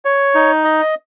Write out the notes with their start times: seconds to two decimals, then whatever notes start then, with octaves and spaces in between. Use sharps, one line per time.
0.05 C#5
0.35 D#4
0.64 D#5